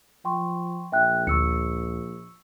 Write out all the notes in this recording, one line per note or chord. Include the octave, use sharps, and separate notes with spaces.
F3 G5 C6 C#6
A#1 E5 G5 F#6
D2 C#6 E6 C#7